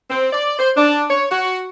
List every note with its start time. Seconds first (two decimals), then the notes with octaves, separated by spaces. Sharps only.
0.10 C4
0.33 D5
0.59 C5
0.76 D4
1.10 C#5
1.31 F#4